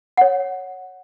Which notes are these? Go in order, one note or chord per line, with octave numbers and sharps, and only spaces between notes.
C#5 F#5